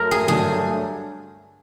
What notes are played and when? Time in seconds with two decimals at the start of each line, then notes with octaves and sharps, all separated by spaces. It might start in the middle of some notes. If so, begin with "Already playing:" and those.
Already playing: F#2 A3 A#4
0.11 G#4
0.28 G2 D3 F#3 A3 D4 G#4